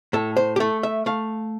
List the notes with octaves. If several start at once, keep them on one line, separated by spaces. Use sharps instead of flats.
A2 A4
C5
G4
A3 A4
E5
A3 F5